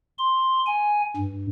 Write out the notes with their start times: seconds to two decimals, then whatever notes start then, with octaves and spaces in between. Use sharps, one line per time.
0.18 C6
0.67 G#5
1.17 G2